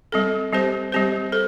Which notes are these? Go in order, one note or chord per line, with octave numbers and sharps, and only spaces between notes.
G3 C4 A4
G3 C4 G4 C5
G3 C4 G4 C5
A4 C5